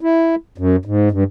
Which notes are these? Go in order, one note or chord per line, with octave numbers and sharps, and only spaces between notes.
E4
F#2
G#2
G2